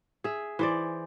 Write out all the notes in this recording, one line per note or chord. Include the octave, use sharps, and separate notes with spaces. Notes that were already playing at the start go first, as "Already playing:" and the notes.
G#4 E5
E3 C5 D5